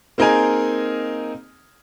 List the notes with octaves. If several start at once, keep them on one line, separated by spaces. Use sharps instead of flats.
A#3 C4 D#4 G#4 A#4 G#5